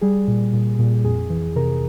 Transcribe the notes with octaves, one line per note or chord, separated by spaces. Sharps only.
G3 G#4
A#2
A#2
A#2
F2 G#4
E3
C3 A#4